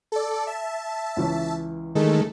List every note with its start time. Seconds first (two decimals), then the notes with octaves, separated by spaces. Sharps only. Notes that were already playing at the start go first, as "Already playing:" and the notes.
0.12 A4 D5
0.47 E5 A5
1.17 C#2 E3 C#5
1.95 D#3 G#3 A3 A4